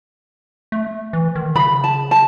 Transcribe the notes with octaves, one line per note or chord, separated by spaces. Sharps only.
A3
E3
D#3
C#3 B5
A5
A5